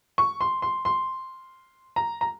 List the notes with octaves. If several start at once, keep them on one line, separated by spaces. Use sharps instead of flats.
C#6
C6
C6
C6
A#5
A#5